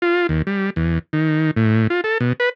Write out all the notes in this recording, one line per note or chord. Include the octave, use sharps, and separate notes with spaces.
F4
D#2
G3
E2
D#3
A2
F4
A4
B2
B4